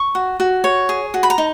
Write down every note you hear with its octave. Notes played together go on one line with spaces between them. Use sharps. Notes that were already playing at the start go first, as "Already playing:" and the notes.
Already playing: C#6
F#4
F#4
C#5
G#4
F#4
B5
A#5
D#4